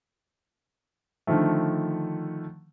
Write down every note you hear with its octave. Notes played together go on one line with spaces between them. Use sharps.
D3 D#3 F3 A3